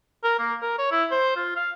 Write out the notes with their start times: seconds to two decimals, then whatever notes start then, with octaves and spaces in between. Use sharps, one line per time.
0.24 A#4
0.39 A#3
0.62 A#4
0.78 C#5
0.92 E4
1.11 C5
1.37 F4
1.56 F5